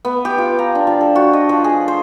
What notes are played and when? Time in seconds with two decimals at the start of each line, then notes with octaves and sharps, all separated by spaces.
0.05 B3
0.25 G4
0.38 F4
0.59 A#5
0.75 D4
0.87 F3
1.01 A4
1.16 F#4
1.33 D#5
1.49 F3
1.64 G#4
1.88 C5